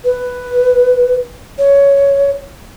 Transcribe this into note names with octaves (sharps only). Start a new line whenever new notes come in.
B4
C#5